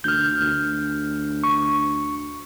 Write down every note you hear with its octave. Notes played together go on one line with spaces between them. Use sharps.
D2 F6 G6
D2
C#6